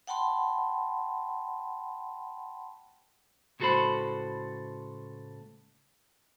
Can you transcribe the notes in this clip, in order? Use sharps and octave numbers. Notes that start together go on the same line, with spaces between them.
F#5 G5 A5 B5 C6
C#2 A2 F#4 A4 C5 B5